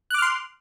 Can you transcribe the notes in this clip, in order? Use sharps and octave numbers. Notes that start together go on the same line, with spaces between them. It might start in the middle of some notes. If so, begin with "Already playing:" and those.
C6 D6 F6 F#6